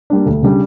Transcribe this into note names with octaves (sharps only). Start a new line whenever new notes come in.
G3 A#3 D4
D2
C#3 G3 D4